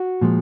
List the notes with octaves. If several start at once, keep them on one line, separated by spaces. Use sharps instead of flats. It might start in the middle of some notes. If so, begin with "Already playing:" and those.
Already playing: F#4
A#2 F3 G#3